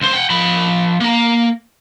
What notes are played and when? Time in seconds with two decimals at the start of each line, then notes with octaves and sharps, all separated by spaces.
0.01 C#2 C5
0.13 F#5 G5
0.30 F3 B5
1.00 A#3 A#5